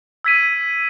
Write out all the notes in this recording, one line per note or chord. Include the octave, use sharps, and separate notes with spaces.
E6 G#6 B6 D#7